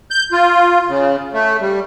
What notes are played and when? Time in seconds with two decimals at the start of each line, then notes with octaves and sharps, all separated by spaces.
0.11 G6
0.32 F4
0.88 C#3
1.33 A3
1.60 G3